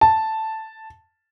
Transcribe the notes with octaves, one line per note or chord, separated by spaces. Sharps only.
A5